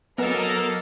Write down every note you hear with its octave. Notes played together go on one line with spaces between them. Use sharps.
F#3 A#3 B3 A4 A#4 D#5